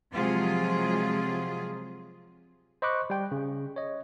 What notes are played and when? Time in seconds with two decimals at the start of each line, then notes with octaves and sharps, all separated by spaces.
0.13 C3 F3 F#3 G#3 F4 G#4
2.82 C5 D#5 B5 C#6 D6 F#6
3.10 G3 G5
3.32 C#3
3.76 C#5 D#5